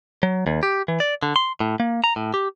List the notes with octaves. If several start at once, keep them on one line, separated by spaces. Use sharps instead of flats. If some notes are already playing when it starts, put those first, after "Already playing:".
F#3
D#2
G4
E3
D5
D3
C6
A2
A#3
A#5
A2
G4